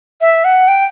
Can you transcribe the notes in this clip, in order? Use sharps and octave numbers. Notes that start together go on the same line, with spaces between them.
E5
F#5
G5